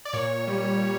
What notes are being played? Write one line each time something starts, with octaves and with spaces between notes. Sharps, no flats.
D5
A#2 C#5
G3
G3